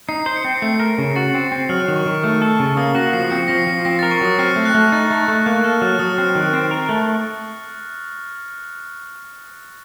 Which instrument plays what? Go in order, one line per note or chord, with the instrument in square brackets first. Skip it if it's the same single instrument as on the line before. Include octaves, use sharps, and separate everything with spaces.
[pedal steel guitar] D#4 [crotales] C7
[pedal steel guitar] C5
[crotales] C#7
[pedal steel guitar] C4
[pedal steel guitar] A3 [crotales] C7
[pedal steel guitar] A#4
C#3
[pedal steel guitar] F#4 [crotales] A6
[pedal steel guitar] C4
C4
[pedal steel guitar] F#3 [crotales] F6
[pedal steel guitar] D#3
[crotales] C#6
[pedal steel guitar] D#3
[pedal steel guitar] A3 [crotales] F6
[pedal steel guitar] A4
C#3
[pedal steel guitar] A#3 [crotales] D#6
[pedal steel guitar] F#4 [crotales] A#6
[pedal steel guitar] F3 [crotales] C7
[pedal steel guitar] C4 [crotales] C#7
[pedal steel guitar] F3 [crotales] A#6
[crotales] C7
[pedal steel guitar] F3
[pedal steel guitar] C4 [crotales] A#6
[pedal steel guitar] A#4 [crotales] A6
[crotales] C#6
[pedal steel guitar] F#3 [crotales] D#6
[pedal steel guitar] C4 [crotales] F6
[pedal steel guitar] A3
[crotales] F#6
[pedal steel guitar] A3
[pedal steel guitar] D#4 [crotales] A6
[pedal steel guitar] A3
A3
[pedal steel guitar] A#3 [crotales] F#6
[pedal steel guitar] A4 [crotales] F6
[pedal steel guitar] F#3 [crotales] F6
[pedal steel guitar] F#3 [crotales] D#6
[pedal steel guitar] C4 [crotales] F6
[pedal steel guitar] D#3 [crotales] F#6
[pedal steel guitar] C4
A#4
A3